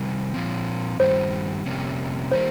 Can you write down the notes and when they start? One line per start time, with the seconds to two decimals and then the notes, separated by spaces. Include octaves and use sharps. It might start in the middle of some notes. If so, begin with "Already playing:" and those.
Already playing: C3 D#3 G3
0.34 A#2 F3 C4
0.99 G2 D#3 G3 C5
1.66 F2 C3 G3 A#3 C#4
2.32 D#3 G3 A#3 C5